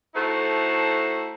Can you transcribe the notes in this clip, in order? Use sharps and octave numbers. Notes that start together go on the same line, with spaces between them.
A3 D#4 E4 F#4 A4 C5